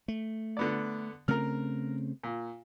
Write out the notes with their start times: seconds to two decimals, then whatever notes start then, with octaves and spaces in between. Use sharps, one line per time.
0.08 A3
0.57 D3 B3 D5
1.28 C#3 A3 C4 A#4 F6
2.24 A#2